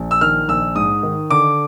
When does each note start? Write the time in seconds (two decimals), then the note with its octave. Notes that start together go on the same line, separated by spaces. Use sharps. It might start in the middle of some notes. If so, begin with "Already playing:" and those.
Already playing: A#1
0.11 E6
0.21 D#3 F6
0.48 A#1 E6
0.75 G#2 D#6
1.03 D#3
1.30 D3 D6